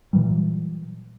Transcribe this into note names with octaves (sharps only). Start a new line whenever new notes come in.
A#2 E3 F#3 G3